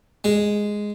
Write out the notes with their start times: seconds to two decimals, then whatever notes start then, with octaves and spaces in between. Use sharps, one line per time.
0.24 G#3